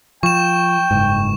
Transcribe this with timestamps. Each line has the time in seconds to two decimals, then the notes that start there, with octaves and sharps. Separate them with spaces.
0.23 F3 G5 C#6 E7
0.91 F#1 G#2